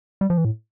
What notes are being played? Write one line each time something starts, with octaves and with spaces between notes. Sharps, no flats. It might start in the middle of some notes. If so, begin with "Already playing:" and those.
G3
F3
E3
A2